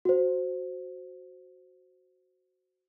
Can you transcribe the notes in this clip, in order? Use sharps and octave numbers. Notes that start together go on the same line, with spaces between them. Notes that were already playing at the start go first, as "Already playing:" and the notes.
F#4 C5